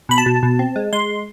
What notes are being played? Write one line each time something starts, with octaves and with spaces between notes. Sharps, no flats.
B2 B5
A5
B2
B2
C4
G#3
G#3 C6